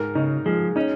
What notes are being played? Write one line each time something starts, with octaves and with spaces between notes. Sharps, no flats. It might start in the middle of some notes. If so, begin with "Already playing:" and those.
Already playing: G#2 A#4
C#3 D#4
F3 G#3
C#4 D#4